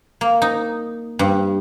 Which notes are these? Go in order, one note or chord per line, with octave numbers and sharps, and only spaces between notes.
A#3
D#4
G2